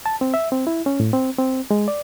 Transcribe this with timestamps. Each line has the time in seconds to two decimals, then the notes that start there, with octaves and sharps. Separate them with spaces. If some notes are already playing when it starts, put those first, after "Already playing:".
0.06 A5
0.21 C4
0.34 E5
0.52 C4
0.67 E4
0.86 C#4
1.00 A2
1.13 C4
1.39 C4
1.71 G#3
1.88 D5